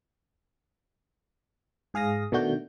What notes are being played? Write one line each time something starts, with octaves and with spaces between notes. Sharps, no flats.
G#2 G#4 F5 D#6 A#6
B2 D#3 A3 D4 F#4 G6